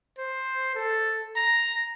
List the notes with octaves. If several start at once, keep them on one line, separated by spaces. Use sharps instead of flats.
C5
A4
A#5